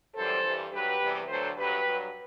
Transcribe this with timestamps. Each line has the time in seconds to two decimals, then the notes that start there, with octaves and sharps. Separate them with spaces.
0.16 F#2 E3 G3 A4 C5
0.44 G2 E3 G3
0.71 G2 F#3 G4 B4
1.00 E2 C3 E3 G3
1.28 D2 D3 F#3 A4 C5
1.56 G2 F#3 G4 B4
1.85 G2 F#3